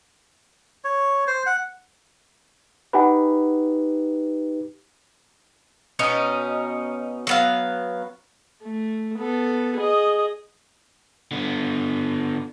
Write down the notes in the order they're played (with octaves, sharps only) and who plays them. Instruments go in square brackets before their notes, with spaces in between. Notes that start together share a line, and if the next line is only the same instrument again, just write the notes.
[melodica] C#5
C5
F#5
[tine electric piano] D#4 G4 B4 [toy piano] F#5 G#5 B5
[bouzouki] B2 C#4 D#4
F#3 B3 F5
[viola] A3
B3 A4
G#4 D#5
[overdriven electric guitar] D3 B3